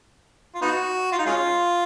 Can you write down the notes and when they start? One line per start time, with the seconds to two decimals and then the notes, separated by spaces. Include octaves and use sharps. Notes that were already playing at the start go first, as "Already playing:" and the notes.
0.55 F4
0.62 B3 D#4 F#4
1.12 F4
1.18 D#4
1.26 G#3 C#4 F4